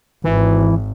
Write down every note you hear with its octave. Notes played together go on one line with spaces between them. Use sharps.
G#1 E3